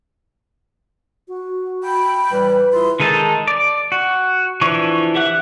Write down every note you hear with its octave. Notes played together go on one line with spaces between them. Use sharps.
F#4
G5 B5
A2 E3 G3 B4
E4 F4 G#4 C6
D#3 G#3 D#4 A4 A5
D5
F#4
E3 F3 D4 C#5 C#6
G4 E5 F#5 F#6